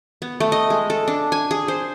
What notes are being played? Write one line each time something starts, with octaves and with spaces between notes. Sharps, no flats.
B3
A3
D#5
G#3
A4
D4
G#5
G#4
C5